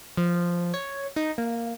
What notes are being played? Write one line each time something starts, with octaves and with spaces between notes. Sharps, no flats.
F3
C#5
D#4
A#3